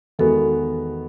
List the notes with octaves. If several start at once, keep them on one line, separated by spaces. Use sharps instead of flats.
E2 D#3 G#3 B3 F#4 A4